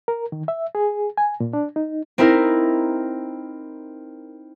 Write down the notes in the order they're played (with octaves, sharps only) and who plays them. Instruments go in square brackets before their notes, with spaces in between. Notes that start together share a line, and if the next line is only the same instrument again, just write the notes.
[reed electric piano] A#4
D#3
E5
G#4
G#5
A#2
D4
D#4
[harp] C4 D#4 E4 A#4